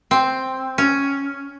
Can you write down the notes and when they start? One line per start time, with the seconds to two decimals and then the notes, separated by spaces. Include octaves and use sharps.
0.11 C4
0.78 C#4